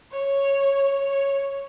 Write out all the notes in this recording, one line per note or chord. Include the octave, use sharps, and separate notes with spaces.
C#5
C#5